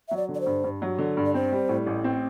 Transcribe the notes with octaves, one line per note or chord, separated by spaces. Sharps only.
F#3 E5
D5
D3
D5
C5
G2
G2
F#3
D3
G2
D5
C4 C5
G3
A2
A1
C4